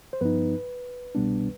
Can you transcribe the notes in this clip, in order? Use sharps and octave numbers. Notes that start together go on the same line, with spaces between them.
C5
G2 F3 B3 D#4 B4
C2 B2 G3 B3 D4